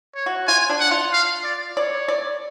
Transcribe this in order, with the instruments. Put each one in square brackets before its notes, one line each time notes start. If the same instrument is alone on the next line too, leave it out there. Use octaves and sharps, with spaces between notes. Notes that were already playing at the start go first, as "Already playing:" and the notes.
[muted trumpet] C#5
[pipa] F#4
[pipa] F4 [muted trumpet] G#5
[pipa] D4
[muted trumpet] F#5
[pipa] F4
[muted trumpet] F5
D5
[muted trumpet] C#5 [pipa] D5
[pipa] D5